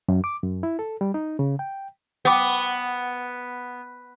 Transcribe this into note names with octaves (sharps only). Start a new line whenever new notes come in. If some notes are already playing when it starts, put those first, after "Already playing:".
F#2
D6
F#2
E4
A4
G3
D#4
C#3
G5
B3 F#5 G5 D6